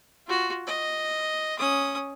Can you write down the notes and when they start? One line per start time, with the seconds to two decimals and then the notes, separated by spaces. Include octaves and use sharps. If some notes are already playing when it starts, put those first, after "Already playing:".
0.27 F4 F#4
0.67 D#5
1.59 C#4 D#6